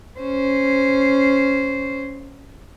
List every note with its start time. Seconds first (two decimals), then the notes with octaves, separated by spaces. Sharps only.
0.20 C#4 C5